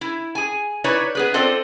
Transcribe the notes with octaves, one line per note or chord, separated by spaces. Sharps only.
E4
G#4 G#5
D#4 E4 B4 C#5 D5
B3 G#4 B4
C4 F4 A4 C5 D5 D#5